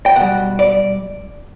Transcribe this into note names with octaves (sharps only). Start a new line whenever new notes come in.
G5
B2 G3 F#5
D5